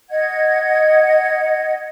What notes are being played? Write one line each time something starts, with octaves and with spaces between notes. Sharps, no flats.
D#5 F#5 G#6